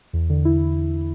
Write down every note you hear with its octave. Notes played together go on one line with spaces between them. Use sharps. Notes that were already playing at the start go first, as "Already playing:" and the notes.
E2
D3
E4